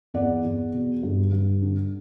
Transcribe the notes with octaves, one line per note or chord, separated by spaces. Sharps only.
E2 D5 F#5
E2
B2
G2
G2
D3